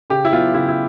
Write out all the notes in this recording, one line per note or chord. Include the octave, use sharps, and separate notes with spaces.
C#3 G4
E4
F#3 B3 F4
C#3 E4
E4